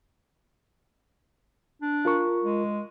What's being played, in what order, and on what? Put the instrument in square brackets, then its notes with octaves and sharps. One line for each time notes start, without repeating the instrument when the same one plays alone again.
[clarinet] D4
[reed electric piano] F4 A#4 C#6
[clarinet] G#3